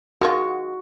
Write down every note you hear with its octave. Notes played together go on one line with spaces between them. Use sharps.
D#3 G#3 F4 F#4